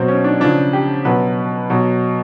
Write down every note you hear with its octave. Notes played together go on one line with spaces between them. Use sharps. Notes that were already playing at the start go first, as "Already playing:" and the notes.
Already playing: B2 F#3 C4
C#4
D4
C#3 F3 D4
G4
B2 F#3 B4
B2 F#3